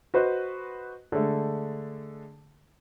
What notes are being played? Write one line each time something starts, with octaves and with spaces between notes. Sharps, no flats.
F#4 B4 C5 D#5
D3 G#3 A3